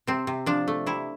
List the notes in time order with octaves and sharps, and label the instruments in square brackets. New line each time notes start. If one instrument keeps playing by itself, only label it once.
[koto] C3 C4
C3
F3 D4
A3
C3 E4